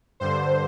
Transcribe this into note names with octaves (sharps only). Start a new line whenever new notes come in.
G2 D3 C5